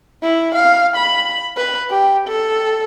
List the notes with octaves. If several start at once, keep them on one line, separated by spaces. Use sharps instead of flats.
E4
F5
B5
B4
G4
A4